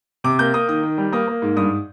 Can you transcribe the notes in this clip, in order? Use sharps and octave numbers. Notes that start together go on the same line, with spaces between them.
C3 D6
A#3 G6
A#3 D#6
D#3 D#6
D#3
G3
A#3 D#6
A#3
G#2
G2 D#6